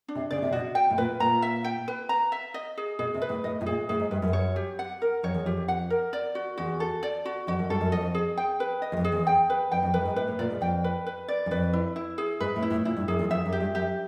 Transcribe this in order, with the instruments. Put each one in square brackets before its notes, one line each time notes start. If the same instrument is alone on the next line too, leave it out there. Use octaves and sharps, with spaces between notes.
[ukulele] D4
[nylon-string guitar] C3
[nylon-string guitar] C#3 [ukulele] D5
[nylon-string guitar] C3
[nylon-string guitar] B2 [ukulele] F#4
[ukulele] G5
[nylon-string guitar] A2
[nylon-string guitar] A#2 [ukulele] B4
[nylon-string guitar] A#2 [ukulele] A#5
[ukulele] E5
G5
B4
A#5
E5
D#5
G#4
[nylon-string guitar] B2 [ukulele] G#4
[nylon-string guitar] C3
[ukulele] B4
[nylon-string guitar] A2
[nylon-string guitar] A2 [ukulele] D#5
[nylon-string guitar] A2
[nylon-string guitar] A#2 [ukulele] G#4
[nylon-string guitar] A2 [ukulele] G#4
[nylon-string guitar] G#2
[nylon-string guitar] G2 [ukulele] B4
[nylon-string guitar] F#2
[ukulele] C#5
G4
F#5
A#4
[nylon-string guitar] F2 [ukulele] C#5
[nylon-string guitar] E2
[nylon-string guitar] F2 [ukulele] G4
[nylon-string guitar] F2
[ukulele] F#5
A#4
D5
F#4
[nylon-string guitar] E2 [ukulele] F#4
[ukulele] A4
D5
F#4
[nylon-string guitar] F2 [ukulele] F#4
[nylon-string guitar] F#2
[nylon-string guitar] G2 [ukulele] A4
[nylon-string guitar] F#2
[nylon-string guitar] F2 [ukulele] D#5
[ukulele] G#4
G5
B4
D#5
[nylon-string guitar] E2
F2
[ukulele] G#4
[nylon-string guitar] E2
[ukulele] G5
B4
[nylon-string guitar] F2 [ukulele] G5
[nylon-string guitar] F2
[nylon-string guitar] F#2 [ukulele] B4
[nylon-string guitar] G2
G#2
[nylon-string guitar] A2 [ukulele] B4
[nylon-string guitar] A2
[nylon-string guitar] A#2 [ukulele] D5
[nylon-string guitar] G#2
[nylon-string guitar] F2 [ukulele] G5
[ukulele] B4
B4
D5
[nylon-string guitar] F#2
[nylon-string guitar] F2 [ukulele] B4
[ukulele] E4
E4
G#4
[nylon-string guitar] G#2 [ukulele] B4
[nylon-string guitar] A2
[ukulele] E4
[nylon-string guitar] A2
[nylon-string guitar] A#2 [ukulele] E4
[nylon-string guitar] G2
[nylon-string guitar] F#2 [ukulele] G#4
[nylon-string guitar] E2
[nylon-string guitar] F2 [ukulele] E5
[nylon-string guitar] F#2
[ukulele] G4
[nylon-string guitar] G2
[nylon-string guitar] F#2 [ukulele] G4